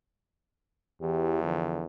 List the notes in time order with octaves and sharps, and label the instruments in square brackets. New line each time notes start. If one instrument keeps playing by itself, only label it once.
[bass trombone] E2 [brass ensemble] E3 G4
[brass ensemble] D3 F3